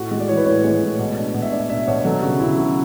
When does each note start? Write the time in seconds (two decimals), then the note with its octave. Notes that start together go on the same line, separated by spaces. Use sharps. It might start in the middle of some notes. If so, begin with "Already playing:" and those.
Already playing: A2 F#4
0.11 G#3
0.20 D5
0.29 E3 C#5
0.37 B4
0.46 A2 C#5
0.64 G#3
0.82 A2
0.99 B2
1.17 D4
1.34 B2
1.42 E5
1.52 D4 D5
1.70 D4 E5
1.87 B2 C#5
2.05 F#3 A4
2.22 C#3 F#4
2.40 C#3 E4
2.58 C#3 F#4